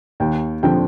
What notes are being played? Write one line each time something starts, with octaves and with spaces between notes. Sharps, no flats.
D#2 G5
D3 F3 C4 G5